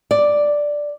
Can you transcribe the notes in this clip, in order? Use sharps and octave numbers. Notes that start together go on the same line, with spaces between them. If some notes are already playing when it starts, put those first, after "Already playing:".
D5